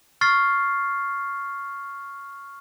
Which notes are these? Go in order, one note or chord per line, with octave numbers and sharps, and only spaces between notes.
C#6 F6 A6 C7